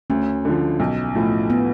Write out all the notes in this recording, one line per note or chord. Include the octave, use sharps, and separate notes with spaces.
D2 C#4
D3 F3
B1
A2 F3
B3